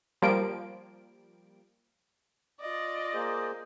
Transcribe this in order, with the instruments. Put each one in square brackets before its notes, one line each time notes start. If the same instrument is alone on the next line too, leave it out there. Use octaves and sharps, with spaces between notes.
[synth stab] F3 G3 A#3 D7
[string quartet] F4 D5 D#5
[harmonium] A#3 G#4 C5